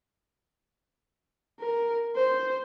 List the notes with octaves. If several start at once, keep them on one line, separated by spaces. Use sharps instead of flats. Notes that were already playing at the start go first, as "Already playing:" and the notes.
A#4
C5